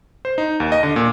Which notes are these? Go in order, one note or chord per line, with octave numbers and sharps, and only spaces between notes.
C5
D#4
D#2
D#5
D3
A#2